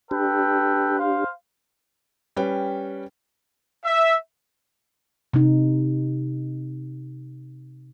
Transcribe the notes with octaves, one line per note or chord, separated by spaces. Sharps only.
D4 G4 A4 B4 G5
C5 F5
G3 C#4 B4 G5
E5
C3 D#4